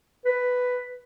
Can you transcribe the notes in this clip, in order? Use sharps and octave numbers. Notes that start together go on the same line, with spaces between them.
B4